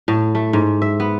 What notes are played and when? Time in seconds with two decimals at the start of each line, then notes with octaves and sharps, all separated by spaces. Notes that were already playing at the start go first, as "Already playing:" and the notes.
0.08 A2
0.35 A3
0.53 G#2
0.82 E5
1.00 B3